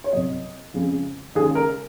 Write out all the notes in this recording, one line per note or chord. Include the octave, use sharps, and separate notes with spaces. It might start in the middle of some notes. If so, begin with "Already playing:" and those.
C#5
C2 C3 F#3 D#5
F2 C#3 F3 G#3
D#2 C#3 G#3 G#4
A#4